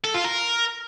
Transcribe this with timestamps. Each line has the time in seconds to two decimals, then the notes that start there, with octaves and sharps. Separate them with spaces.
0.04 A4
0.14 F4
0.24 A#4